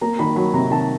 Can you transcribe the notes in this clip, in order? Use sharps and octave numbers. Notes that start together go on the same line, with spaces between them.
A#3 A#5
D#3 B5
F#3 B5
C3 A#5
D#3 A5